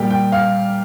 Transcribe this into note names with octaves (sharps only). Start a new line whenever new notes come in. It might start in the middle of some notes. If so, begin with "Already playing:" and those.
Already playing: A#2 G3 G5
G5
F5